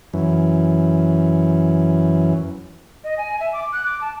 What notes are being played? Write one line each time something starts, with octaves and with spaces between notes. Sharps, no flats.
F#2 E3
D#5
G#5
E5
D6
F#6
D6
A5